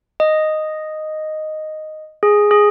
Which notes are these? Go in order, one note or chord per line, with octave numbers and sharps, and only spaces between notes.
D#5
G#4
G#4